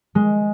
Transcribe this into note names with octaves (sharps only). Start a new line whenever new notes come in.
G#3